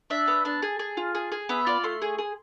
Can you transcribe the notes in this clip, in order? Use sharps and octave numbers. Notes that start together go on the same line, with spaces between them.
D4 E5
B3
D4 A5
G#4
G#4
F4
G#4
G#4
B3 E5
F4 D5
A3 C6
G#4
G#4